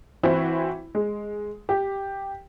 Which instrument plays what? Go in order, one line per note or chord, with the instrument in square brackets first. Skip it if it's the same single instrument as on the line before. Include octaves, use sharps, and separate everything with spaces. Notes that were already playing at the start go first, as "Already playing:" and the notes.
[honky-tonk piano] E3 C4 E4 F#4
G#3
G4